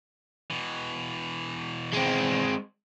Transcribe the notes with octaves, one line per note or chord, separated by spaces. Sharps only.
B2 E3
G#3 C4